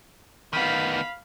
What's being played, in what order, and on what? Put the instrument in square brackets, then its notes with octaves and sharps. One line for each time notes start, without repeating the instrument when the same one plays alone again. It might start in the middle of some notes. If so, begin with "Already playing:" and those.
[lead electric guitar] D#3 B3 [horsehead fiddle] F5 B5